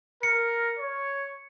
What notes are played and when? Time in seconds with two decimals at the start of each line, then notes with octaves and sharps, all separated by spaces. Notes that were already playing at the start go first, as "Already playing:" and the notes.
0.23 A#4 C#7
0.79 C#5